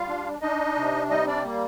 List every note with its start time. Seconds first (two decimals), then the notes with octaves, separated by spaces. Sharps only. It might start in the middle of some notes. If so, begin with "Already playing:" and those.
Already playing: G3 F4 F5
0.08 D4
0.41 D4 D#4 D#5
0.76 C3
1.10 G3 D#4 D#5
1.27 D4 D5
1.45 A#3